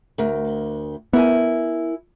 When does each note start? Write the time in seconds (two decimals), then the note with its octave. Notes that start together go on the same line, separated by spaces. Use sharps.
0.18 D2 A#4
1.13 B3 E4 A#4 G#5